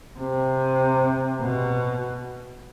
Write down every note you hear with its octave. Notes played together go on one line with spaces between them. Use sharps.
C3
B2